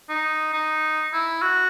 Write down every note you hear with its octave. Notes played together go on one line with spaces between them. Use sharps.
D#4
D#4
E4
F#4